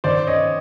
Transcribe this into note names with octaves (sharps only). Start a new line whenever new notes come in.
D#3 C5 D5
C#5 D#5